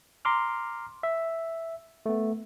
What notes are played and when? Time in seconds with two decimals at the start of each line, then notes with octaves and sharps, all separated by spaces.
0.25 A#5 C6 D6 F6
1.03 E5
2.06 A3 B3